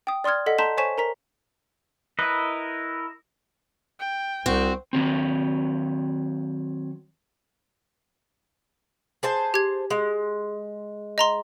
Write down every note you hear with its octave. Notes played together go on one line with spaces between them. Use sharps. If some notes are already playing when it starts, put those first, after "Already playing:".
G5 D#6
D5 C6 D#6 F6 G#6
A4 D#5 F#5 B6
A5 A#5 C6 G6 B6 E7
C5 C#5 G#5 C#6 B6 E7
A#4 A#5 B6
E4 A#4 B4 D#5
G5
C2 C4 F#4
D#3 F#3 C4
G#4 C5 A5
G4 G#6
G#3
D#5 A#5 C6